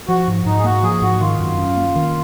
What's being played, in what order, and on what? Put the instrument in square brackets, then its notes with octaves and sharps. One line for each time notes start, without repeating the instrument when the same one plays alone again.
[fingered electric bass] F3 [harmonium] F#4
[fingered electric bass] G#2
[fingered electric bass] G#2 [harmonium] D#4
[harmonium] G#4
[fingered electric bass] A#3 [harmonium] F#4
[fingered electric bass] F3 [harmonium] G#4
[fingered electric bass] G#2 [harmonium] F#4
[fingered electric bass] D#3 [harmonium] F4
[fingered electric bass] F#2
C#4
A#3
D#3